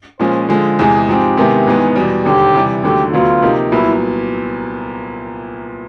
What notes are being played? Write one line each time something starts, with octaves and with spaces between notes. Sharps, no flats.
A#2 F3 G#3 C#4 C5
D3 F3 G#3 G#4
E2 C3 E3 G#3 G#4
G#2 F3 G#3 C4 G4
C3 D#3 G#3 B3 E4
G#1 G#2 E3 G#3 B3
E2 B2 G3
E1 D#2 D3 G4
C3 E3 G3
D#2 D3 F#3 A3 G4
D2 D3 F#3 B3 F4
C3 F3 A#3 D#4 G4
C2 A#2 F#3 B3 E4